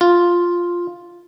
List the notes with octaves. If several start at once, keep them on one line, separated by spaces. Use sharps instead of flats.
F4